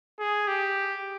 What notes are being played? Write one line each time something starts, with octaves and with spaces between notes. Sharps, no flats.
G#4
G4